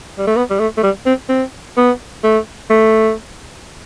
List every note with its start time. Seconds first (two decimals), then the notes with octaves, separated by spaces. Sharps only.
0.18 G3
0.27 A3
0.36 B3
0.50 G3
0.59 A3
0.77 A3
0.83 G3
1.06 C4
1.29 C4
1.77 B3
2.24 A3
2.70 A3